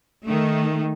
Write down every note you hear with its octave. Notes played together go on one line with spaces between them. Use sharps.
D#3 A3